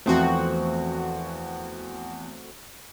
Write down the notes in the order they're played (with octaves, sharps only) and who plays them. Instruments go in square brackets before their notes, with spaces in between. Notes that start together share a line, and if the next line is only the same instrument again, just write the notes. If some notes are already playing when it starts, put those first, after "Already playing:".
[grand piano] E2 F3 [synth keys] A3 C4 F#4